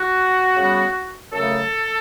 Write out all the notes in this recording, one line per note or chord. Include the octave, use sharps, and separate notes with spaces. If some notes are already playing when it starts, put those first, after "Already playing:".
Already playing: F#4
C#3 G3 B3
F#2 C#3 F#3 A3 A4